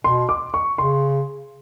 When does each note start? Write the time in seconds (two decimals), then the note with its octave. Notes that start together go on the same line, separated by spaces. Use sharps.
0.04 B2 C6
0.29 D6
0.54 C#6
0.78 C#3 C6